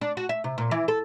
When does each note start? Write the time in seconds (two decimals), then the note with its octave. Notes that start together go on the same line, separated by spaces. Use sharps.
0.01 D4
0.17 F#4
0.29 E5
0.44 C3
0.58 A#2
0.71 E3
0.88 A4